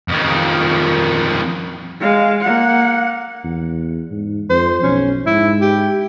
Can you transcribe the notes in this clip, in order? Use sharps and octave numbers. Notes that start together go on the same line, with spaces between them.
F2 D#3
G#3 F5
A#3 F#5
E2
G#2
F2 C5
B1 C#4
G#2 E4
G4